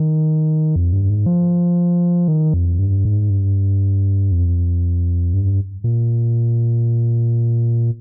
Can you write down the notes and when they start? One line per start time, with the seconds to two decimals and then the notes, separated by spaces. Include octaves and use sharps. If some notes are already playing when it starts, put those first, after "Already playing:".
Already playing: D#3
0.76 F2
0.93 G2
1.10 G#2
1.26 F3
2.28 D#3
2.54 F2
2.79 G2
3.05 G#2
3.30 G2
4.32 F2
5.34 G2
5.84 A#2